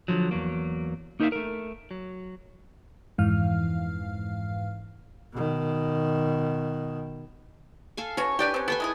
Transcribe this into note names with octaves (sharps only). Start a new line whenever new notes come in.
D3 F3 F#3
E2 F#3 A#3
A#3 D#4 A#4 C#5 E5 F5
A3 A#4
F#3
F2 G#2 E3 F5 F6
B2 D#3
A4 F5 G#5
C#4 F#4 B4 C#5
D4 G4 B4 D5 G5 G#5
C4 C#4
B3 A4 G5 G#5
G#3 E4 G#4